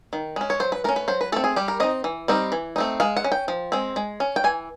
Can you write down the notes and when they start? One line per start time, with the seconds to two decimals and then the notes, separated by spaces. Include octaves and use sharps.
0.13 D#3
0.36 G#3 C#4
0.50 C#5
0.60 F#3 C5
0.72 B4
0.84 A3 C#4 A#4
0.96 B4
1.08 F#3 C5
1.21 B4
1.32 A3 C4 A4
1.44 G#4
1.56 G3 G4
1.68 A#4
1.80 C4 D#4 D#5
2.04 E3
2.28 G3 C4 D#4
2.52 E3
2.76 A3 C4 D#4
3.00 G#3 F5
3.17 F#5
3.24 C#4
3.32 G5
3.48 F3
3.72 G#3 C4
3.96 G#3
4.20 C#4
4.36 G5
4.44 E3 G#5